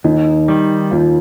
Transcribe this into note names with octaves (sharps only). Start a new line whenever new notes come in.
D#2 D#4
D#3 G3
D#2 F4